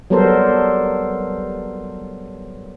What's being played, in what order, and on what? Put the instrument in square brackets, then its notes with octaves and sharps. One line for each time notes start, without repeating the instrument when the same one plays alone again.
[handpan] F#3 G3 B3 A4 A#4 C5